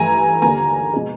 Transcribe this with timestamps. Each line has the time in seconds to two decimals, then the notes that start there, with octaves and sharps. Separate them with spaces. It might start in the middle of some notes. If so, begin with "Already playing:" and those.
Already playing: G2 E3 A3 G#5 A#5
0.42 D#2 D3 G3 A#3 G#5 A#5
0.94 B2 G#3